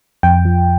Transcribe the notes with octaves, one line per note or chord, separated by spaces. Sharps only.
F2 G5
F3